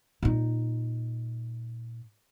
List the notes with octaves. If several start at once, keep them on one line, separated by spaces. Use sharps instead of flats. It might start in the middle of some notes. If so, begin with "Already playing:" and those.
A#2 D#4